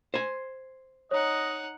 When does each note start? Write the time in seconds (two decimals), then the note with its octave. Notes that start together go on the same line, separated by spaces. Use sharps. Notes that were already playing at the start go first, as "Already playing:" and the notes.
0.14 C5 G#5
1.11 D#4 C#5 D#5 F#5 A#5